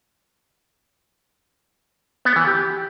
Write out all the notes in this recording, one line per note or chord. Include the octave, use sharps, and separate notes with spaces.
B3
E3
G4